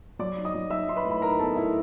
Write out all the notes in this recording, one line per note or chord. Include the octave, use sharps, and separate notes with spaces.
F#3 D5 D6
D#4
D#5 D#6
F#3
D#4 E5 E6
D#4 C6
B4 B5
A2
B5
D#4 A#4 A#5
B3 A4 A5
A2 E4 E5